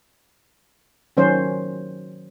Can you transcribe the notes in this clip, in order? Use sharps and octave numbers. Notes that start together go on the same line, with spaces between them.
D#3 F#3 C#4 C5